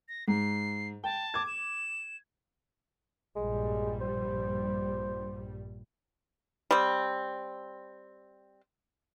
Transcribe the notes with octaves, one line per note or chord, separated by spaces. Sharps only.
A#6
G#2 C7
G5 A5
D6 G#6
E7
A#1 G2 G3 G#3
C5
G3 C4